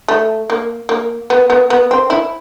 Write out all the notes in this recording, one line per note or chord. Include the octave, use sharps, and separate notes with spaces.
A3
A#3
A#3
B3
B3
B3
C4
E4